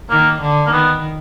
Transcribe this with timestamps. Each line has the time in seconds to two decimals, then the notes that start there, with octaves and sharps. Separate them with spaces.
0.10 D#3 A#3
0.41 D3
0.66 A#3
0.71 D#3 B3